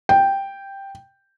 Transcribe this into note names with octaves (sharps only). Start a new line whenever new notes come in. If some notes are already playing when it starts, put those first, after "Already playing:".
G5